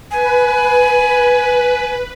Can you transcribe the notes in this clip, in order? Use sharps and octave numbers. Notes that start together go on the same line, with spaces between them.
B4 G#5